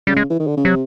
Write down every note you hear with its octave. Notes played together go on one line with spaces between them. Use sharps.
C#3 G3
G#3
E3
D#3
D3
C#3
C3 F#3